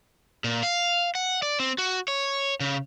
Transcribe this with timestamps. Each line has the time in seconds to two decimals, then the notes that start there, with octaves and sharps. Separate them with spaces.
0.44 A#2
0.63 F5
1.15 F#5
1.43 D5
1.60 C4
1.78 F#4
2.08 C#5
2.60 C#3